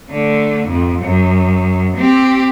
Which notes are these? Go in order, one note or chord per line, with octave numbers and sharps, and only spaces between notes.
D3 A3
F2 G#2
F#2
C4 G4